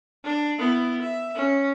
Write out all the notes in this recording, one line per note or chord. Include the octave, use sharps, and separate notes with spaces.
D4
B3 E4
E5
C#4